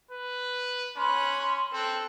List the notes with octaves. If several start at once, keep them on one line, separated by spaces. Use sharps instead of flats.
B4
C#4 B5 C6 F#6
C4 A4 F#6